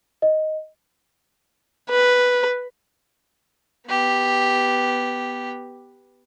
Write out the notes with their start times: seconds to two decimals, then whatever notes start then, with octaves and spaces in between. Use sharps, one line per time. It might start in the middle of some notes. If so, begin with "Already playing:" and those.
0.22 D#5
1.90 B4
3.87 B3 G4